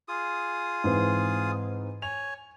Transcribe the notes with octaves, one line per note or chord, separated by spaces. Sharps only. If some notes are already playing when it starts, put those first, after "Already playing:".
F4 G#4 D#6
G#2 E3 C4
C#5 G#5 F7